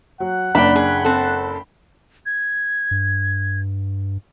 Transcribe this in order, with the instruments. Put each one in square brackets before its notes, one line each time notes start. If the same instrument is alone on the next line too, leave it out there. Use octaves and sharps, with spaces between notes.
[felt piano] F#3 [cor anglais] F#5
[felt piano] F#1 [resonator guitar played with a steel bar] D4 [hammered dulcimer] G5 B5
[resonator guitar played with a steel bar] G#4
C4 A4
[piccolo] G#6
[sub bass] G2